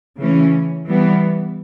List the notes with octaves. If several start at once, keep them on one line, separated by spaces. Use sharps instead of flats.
C#3 E3 A3 C#4
E3 G3 B3